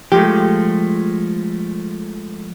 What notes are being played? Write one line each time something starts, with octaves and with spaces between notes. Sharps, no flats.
F3 G#3 A3 G4